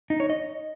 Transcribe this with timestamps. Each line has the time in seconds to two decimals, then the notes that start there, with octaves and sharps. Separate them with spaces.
0.10 D#4
0.20 C#5
0.30 D#5